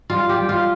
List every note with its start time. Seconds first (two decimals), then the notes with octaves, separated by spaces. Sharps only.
0.10 G3 F4
0.29 G4
0.36 G3
0.49 F4